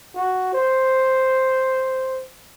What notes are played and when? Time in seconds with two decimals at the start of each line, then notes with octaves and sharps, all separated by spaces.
0.15 F#4
0.53 C5